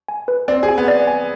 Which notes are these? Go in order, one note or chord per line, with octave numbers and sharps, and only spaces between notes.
G#5
B4
C4 D5
G#4
G#5
B3
D5
G#5